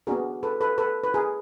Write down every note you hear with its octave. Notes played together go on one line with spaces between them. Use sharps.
B3 D4 F#4 G#4 A#4
A4 B4
A4 B4
A4 B4
B4
G#4 A#4